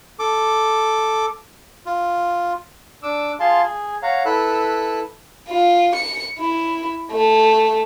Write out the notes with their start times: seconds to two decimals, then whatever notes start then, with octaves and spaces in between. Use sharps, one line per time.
0.19 A4 D6
1.86 F4
3.03 D4 D6 E6
3.40 F4 G#4 F5 A5 C6
3.62 G#4
4.03 C#5 F5 F#5 A#5
4.25 E4 A4 B4 B5 E6 F#6
5.48 F4
5.95 C#7
6.38 E4
7.12 A3